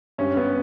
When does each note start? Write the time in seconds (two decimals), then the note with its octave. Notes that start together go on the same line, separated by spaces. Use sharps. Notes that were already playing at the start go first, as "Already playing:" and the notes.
0.18 G2 G3 C#4
0.37 B3